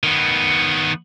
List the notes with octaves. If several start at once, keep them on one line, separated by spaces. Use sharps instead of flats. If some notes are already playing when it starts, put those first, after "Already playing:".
D#3 B3